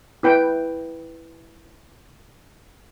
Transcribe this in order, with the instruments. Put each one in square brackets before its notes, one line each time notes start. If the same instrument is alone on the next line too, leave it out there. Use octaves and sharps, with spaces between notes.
[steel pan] E4 B4 G5